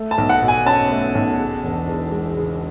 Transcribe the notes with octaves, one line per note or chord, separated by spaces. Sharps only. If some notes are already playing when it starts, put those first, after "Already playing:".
Already playing: A3
A5
B1
F#5
B2
G#5
C#4 A5
A3
B1
C#3
E1
E2
G#3
C#3